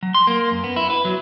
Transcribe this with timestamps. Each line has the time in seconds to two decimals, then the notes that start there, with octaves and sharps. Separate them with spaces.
0.03 F#3
0.14 C6
0.27 A#3
0.51 F#2
0.64 B3
0.76 E4
0.90 B4
1.05 F#3